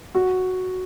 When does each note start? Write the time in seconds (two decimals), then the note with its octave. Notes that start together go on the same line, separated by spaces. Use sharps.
0.15 F#4